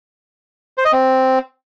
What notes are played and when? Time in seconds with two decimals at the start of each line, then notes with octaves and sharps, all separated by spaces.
0.78 C5
0.85 D#5
0.93 C4